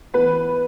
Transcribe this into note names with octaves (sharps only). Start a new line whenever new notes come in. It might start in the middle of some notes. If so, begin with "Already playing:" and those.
E3 B3 B4